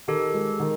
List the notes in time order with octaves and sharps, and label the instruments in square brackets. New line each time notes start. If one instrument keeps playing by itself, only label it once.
[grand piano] D#3 [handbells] G4 A4
[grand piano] G#3
D#3